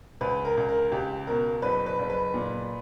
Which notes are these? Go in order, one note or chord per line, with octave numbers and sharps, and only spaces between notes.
C#2 B4
A#4
C#2
A#4
C#2 G4
B2 A#4
F#1 B4
B4
F#1
B4
A#2